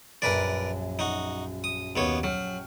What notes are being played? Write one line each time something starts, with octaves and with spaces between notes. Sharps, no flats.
A#1 F#2 A#4 B4 D5
D#4 F#4
D#6
D#2 B3 C#5
F#3 G5 C#6 F6